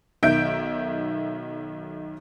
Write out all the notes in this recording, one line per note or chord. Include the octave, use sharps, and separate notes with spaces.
B1 D#3 E5 G6 D7